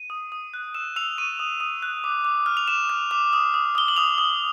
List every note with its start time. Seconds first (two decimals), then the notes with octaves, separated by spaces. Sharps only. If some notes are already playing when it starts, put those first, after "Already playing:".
Already playing: D#7
0.10 D#6
0.32 D#6
0.54 F#6
0.75 E6 E7
0.96 E6 F7
1.18 C#6 D#7
1.40 D#6
1.60 D#6
1.83 F#6
2.04 D6
2.25 D6
2.46 F6
2.57 F7
2.68 D6 E7
2.90 F6
3.11 D6
3.33 D#6
3.54 D#6
3.75 D#6 G7
3.88 F#7
3.96 D#6 F7
4.18 D#6